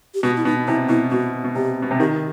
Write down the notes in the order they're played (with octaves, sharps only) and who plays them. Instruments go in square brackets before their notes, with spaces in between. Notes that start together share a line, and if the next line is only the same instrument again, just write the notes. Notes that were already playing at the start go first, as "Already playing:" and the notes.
[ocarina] G4
[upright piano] B2 [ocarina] F#4
[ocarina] E4
[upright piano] B2 [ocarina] D#4
[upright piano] C3 [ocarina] E4
[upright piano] B2 [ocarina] E4
[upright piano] B2 [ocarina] F#4
[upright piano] B2
[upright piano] C3 [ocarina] G4
[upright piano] B2
C3
[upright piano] D#3 [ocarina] G4